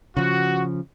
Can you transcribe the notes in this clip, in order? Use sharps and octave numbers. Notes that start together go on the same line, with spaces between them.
C#3 F3 F#4